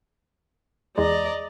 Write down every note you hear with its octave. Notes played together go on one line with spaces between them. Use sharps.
E2 G#3 D5 D#5 A#5